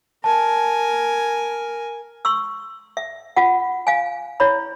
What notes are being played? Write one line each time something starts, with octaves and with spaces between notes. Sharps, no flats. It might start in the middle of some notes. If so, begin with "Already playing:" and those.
A#4 G#5 A5
C6 C#6 E6
E5
F4 F#5
F5 G#5
E4 C#5 B5